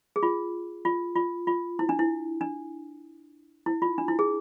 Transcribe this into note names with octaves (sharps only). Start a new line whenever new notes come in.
G#4
F4
F4
F4
F4
E4
D4
E4
D4
E4
F4
D4
E4
G#4